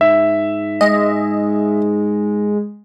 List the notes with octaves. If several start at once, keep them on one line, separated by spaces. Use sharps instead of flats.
G#2 E5
G#3 D#5